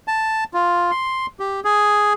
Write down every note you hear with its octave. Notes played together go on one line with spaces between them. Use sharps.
A5
F4
C6
G4
G#4